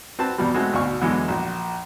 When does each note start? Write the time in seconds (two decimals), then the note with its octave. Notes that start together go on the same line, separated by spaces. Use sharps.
0.19 C4 F#4 B4 A5
0.38 E2 B2 G3
0.54 B2 G#3 A3 C4 F#4
0.73 D2 G#2 B2 F5 C#6
1.01 E2 B2 D3 E3 F#3 G#3
1.28 A#1 F#4